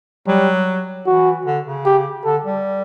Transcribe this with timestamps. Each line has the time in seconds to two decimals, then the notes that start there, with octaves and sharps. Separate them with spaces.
0.27 F#3 G3
1.07 E3 F#4
1.46 D3
1.66 C#3
1.85 G4
2.25 D3 A4
2.44 G3